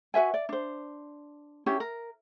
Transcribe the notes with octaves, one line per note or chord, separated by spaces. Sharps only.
F#4 B4 E5 G#5
D5
D4 C5
C#4 D4 E4 G4
A#4